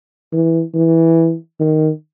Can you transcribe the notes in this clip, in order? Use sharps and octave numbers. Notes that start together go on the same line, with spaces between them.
E3
E3
D#3